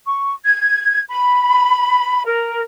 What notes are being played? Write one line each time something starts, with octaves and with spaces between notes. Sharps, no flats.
C#6
G#6
B5
A#4